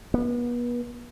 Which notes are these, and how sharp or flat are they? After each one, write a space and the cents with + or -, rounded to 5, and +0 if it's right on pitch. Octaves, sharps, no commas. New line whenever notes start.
B3 -35